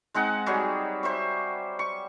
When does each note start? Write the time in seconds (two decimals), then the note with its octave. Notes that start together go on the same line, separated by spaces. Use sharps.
0.14 G#3 C4 D#4 F#5
0.46 F#3 G3 G4 G#4
1.03 C5 E5 C#6
1.79 C#6